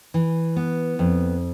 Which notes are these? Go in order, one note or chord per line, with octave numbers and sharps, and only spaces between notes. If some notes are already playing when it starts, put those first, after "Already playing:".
E3
B3
F2